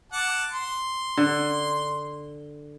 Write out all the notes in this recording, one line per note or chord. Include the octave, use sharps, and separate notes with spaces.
F#5 A5 D6
C6
D3